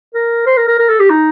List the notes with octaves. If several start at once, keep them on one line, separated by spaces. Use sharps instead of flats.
A#4
C5
A#4
A#4
A#4
A4
G4
D#4